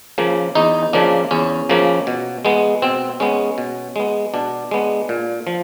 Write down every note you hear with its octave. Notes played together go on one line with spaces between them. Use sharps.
C#3 F3 A#3
E2 D#4
C#3 F3 A#3 D4
E2 C#4
C#3 F3 A#3
B2
G#3 B3
B2 C4
G#3 B3 C#4
B2
G#3 B3
B2 D4
G#3 B3
A#2
F3